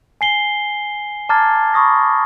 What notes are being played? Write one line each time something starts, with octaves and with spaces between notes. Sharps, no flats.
G#5 C7 G7
A5 A#5 D6 F6 G#6 A6
B5 C#6 D#6 A#6